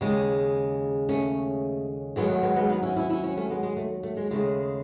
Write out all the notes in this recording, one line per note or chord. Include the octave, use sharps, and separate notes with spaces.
D#2 C#3 G#3
A3 C#4
D#2 D#3 F#3 G#3 B3
A3
G#3 B3
G#3 B3
B3 D#4
C#4 E4
C#4 E4
C#4 E4
C#4 E4
A3 C#4
G#3 B3
G#3
A3
A3
G#3
D#2 C#3 G#3 A3